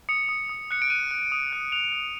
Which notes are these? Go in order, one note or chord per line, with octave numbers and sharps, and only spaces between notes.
D#6 C#7
D#6
D#6
F#6 C#7
D7
F#6 D#7
F#6
D#6
F#6
F#6 F7
F#6